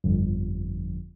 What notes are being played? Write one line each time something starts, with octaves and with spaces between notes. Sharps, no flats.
G1 F2